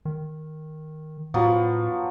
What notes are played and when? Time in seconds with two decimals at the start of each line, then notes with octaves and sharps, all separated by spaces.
0.05 D#3
1.34 A2 F3 F#3 B3